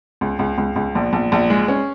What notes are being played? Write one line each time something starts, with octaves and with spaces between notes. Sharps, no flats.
C#2
C#2
C#2
C#2
A#1
A#1
A#1
G#3
C#4